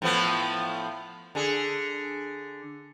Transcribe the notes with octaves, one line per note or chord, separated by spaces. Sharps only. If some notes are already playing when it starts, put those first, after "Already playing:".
A2 F3 B3
D3 G#4